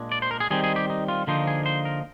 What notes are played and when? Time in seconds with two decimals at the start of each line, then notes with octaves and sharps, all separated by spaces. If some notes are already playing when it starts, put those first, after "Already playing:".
Already playing: A#2 G#3 D4
0.12 D5
0.22 C5
0.31 A#4
0.40 G#4
0.51 D#3 G3 C4 D#4 G#4
0.64 G#4
0.76 G4
0.90 D#4
1.08 F4
1.27 D3 F3 A#3 D#4 C5
1.47 G#4
1.66 C5
1.85 A#4